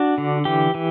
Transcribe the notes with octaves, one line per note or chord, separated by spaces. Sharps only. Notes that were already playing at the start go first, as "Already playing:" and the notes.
Already playing: D4 F#4
D3
E3 G4
E3